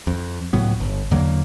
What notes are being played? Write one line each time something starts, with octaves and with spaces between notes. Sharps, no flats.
F2
C#2 A2 F#3 B3
G1
E2 D3 F#3 A#3